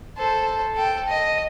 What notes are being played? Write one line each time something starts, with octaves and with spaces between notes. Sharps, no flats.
A4 C5
A4 G5
D#5